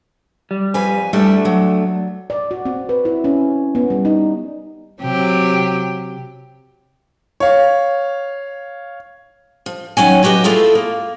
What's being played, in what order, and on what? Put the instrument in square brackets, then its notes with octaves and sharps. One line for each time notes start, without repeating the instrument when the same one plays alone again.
[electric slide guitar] G3
[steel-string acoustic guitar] F2 B4 G#5
[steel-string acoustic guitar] G3 E4 [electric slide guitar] A3 D4
[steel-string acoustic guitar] F#3
[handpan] D5
F#4
C4
B4
E4
C#4
B3
G3
D#4
[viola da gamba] C3 F#3 G4
[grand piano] C#5 F5
[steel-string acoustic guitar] F3
D#3 F#3 C#4 G#5
F#3 F#4 G4 B4 D#5
A3 E4 F4 G#4 A4
A#3